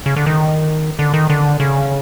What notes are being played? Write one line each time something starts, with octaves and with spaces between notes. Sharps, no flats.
C#3
D3
D#3
D3
D#3
D3
C#3